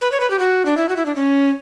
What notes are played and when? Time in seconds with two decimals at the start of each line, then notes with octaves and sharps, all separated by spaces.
0.01 B4
0.12 C#5
0.20 B4
0.30 G4
0.39 F#4
0.65 D4
0.77 E4
0.89 F#4
0.96 E4
1.06 D4
1.16 C#4